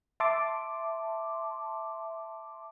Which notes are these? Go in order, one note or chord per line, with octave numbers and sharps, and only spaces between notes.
E5 A5 C6 D6